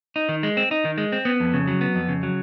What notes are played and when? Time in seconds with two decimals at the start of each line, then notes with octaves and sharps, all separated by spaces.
0.16 D#4
0.29 D#3
0.43 G#3
0.57 C4
0.71 D#4
0.85 D#3
0.98 G#3
1.12 C4
1.25 B3
1.40 F2
1.54 C#3
1.68 F#3
1.81 B3
1.95 F2
2.09 C#3
2.23 F#3